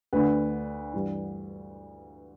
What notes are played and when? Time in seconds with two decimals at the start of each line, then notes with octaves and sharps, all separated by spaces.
0.13 D2 D3 B4
0.94 G2 E3